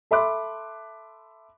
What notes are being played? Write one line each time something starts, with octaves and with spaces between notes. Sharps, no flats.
A4 E5 B5 C6 D6 F#6